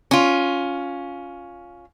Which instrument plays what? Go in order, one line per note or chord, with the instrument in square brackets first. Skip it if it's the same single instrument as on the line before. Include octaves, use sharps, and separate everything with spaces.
[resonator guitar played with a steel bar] C#4 F4